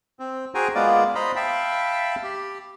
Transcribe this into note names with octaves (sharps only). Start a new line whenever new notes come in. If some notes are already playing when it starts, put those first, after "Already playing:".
C4
F#4 G#4 C5 G5 G#5 A#5
G#3 A#3 B3 F4 D5
C5 D#5 A#5 B5
E5 F5 G5 A5 B5
G4